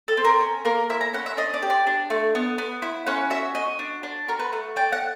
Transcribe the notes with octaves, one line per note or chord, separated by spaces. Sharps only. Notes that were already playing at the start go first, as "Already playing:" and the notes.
A4
C4
A#4
C#4
A#3 A#4
E4 E5
A#5
C#4 F#5
E5
D4 D#5
D5
G4
D5
D4
A3
B3
B3
E4
C#4 F#5
F#4 E5
F#4 D#5
D4
D4
F#4 A#4
B4
A3
D4 G5
F#5